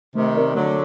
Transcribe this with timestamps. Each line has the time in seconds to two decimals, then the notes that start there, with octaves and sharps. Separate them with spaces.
0.15 C3 D#3 A3
0.36 C4 G4 A#4 D5
0.55 D3 F#3 A3